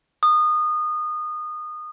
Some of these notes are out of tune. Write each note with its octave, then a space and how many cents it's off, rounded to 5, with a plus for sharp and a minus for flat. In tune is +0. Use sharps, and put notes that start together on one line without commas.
D#6 -25